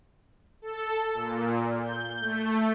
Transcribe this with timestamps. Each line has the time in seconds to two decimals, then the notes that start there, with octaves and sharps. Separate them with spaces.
0.62 A4
1.14 A#2
1.82 G6
2.21 A3